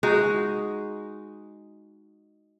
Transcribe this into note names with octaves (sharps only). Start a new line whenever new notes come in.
G#3 D#4 F#4